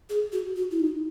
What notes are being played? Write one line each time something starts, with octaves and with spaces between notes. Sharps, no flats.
G#4
F#4
F#4
E4
D#4